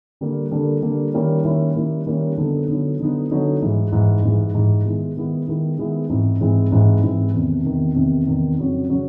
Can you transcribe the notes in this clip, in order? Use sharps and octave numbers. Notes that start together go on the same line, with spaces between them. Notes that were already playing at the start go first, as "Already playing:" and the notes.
D3 G3 A#3
D3 G3 A#3
D3 G3 A#3
D#3 G3 A#3 C#4 E4
D#3 G3 A#3 C#4 E4
D#3 G3 A#3 C#4 E4
D#3 G3 A#3 C#4 E4
D3 F#3 B3 D#4
D3 F#3 B3 D#4
D3 F#3 B3 D#4
D3 F#3 B3 D#4
G#2 E3 G#3
G#2 E3 G#3
G#2 E3 G#3
G#2 E3 G#3
D#3 G#3 B3 E4
D#3 G#3 B3 E4
D#3 G#3 B3 E4
D#3 G#3 B3 E4
G#2 E3 G#3 C4
G#2 E3 G#3 C4
G#2 E3 G#3 C4
G#2 E3 G#3 C4
E2 C3 D#3
E2 C3 D#3
E2 C3 D#3
E2 C3 D#3
F2 C#3 F#3
C#3 F#3